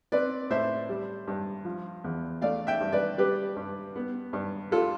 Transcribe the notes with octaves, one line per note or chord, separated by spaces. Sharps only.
C4 B4 D5
A2 C5 E5
G3
G2
F3
E2
A3 D5 F5
E5 G5
G2
B4 D5
G3 G4 B4
G2
B3
G2
G3 F4 A4